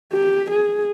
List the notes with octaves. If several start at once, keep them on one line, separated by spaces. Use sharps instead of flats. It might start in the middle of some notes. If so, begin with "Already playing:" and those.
G4
G#4